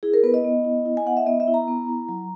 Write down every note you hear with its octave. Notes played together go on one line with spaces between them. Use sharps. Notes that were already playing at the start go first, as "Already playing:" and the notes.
E4 G#4
A#4
B3 B4
D#5
B3
E4
E4
G#5
B3 F#5
E5
B3 D#5
E5
E4
A#5
B3
E4
F#3